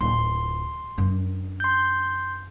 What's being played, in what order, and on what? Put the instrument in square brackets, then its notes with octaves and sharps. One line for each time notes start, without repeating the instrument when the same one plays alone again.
[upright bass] D1 F4 [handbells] C6
[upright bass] F#2 D4
[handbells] C6 G6